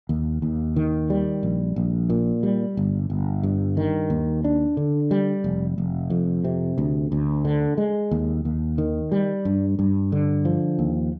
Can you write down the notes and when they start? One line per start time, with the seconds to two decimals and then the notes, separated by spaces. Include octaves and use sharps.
0.09 D#2
0.42 D#2
0.76 D#3
1.10 G3
1.43 A#1
1.76 A#1
2.10 A#2
2.43 G3
2.77 G1
3.10 G1
3.43 G2
3.77 D#3
4.10 D#2
4.44 D4
4.77 D3
5.11 G3
5.44 F1
5.78 F1
6.10 F2
6.44 C3
6.78 D2
7.12 D2
7.45 D3
7.78 G#3
8.11 D#2
8.45 D#2
8.78 D#3
9.12 G3
9.45 G2
9.79 G2
10.12 D3
10.45 F3
10.79 D#2